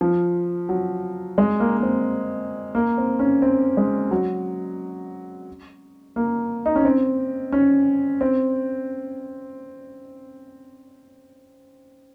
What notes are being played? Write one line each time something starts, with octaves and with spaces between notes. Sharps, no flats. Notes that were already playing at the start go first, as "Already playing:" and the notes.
F3
F#3
G#3
A#3
A#3
C4
A#3
C4
C#4
C4
G#3
F#3
A#3
D#4
C#4
C4
C#4
C4